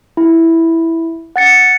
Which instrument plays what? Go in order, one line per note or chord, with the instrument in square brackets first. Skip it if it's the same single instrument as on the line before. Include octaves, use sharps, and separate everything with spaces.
[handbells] E4
F#5 A6 C#7